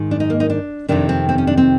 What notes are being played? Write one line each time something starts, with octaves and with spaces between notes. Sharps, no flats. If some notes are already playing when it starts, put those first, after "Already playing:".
Already playing: G#2 D#3
D4
D#4
A#3
D#4
D4
F2 C3 D#3 D4
C4
C4
C#4
D4
C4